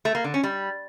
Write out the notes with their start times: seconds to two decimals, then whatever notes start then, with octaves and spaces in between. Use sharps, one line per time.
0.05 A3
0.15 A#3
0.24 D3
0.34 C#4
0.43 G3